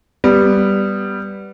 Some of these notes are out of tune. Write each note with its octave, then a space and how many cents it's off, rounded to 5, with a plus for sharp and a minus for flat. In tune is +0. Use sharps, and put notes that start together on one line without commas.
G3 +0 B3 +0